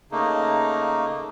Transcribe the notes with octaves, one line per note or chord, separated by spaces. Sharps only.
C#3 A3 A#3 D#4